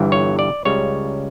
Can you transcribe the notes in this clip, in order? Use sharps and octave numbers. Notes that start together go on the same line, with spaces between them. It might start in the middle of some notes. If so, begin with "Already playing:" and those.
Already playing: G1 G2 E3 G3
C#5
D5
C#2 C#3 G3 C#5